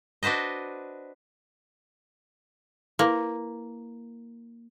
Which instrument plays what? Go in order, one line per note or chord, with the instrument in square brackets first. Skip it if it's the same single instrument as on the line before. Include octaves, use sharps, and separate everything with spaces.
[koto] D4 F#4 B4 C5 D#5
[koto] A#3 [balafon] E4 B4